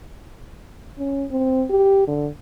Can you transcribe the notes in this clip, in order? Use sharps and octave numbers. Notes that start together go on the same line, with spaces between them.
C#4
C4
G4
D3